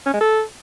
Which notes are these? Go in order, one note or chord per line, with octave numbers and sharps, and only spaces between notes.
C#4
G#3
A4